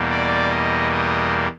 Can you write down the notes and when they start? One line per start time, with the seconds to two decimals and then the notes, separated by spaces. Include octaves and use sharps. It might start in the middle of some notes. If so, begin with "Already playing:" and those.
Already playing: E2 B2 G3 A#3
0.11 D5
0.51 D#5
0.92 D#5